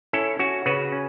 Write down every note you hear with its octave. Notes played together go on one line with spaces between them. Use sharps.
C#4 E4 A4
C#4 F#4
C#3 F#4 B4
C#4